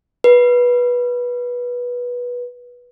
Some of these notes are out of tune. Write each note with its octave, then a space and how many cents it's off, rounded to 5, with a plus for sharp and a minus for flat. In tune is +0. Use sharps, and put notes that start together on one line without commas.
B4 -15